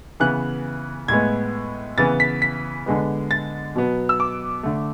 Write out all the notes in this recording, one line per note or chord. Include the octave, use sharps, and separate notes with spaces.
C#3 E3 B3 F#6
A2 G#3 B3 G#6
C#3 E3 B3 A6
B6
B6
D3 G#3 B3
A6
B2 F#3 B3
E6
D6
D3 A3